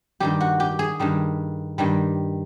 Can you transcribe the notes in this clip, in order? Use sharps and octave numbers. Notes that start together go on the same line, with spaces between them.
G2 D#3 G3 G4
F#4
G4
G#4
G2 D#3 G3
G2 D#3 G3